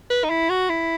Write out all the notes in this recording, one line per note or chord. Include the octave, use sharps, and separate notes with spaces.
B4
D#4
E4
F#4
E4